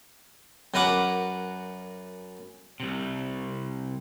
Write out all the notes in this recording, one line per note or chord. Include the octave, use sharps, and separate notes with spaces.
F#2 A#4 B4 F#5 D6
C2 C3